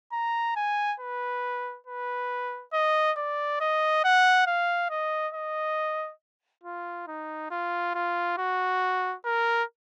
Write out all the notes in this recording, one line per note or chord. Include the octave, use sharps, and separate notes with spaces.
A#5
G#5
B4
B4
D#5
D5
D#5
F#5
F5
D#5
D#5
F4
D#4
F4
F4
F#4
A#4